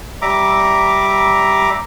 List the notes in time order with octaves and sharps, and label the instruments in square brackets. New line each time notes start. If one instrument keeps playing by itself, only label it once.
[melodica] G3 E5 A#5 D6